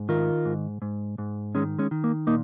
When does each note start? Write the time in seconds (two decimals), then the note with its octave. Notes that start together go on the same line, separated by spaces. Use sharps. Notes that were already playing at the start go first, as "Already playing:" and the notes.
Already playing: G#2
0.09 D#3 F4 A#4
0.45 G#2
0.82 G#2
1.18 G#2
1.55 D#3 G#3 C#4
1.79 G#3 C#4
1.91 D#3
2.04 A#3
2.27 A#2 A#3 D#4